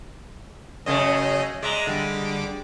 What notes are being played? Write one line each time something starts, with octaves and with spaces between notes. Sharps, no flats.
F#2 C#3 A3 G#4 D#5
G#3 D5 E5 A#5
D3 G3 D6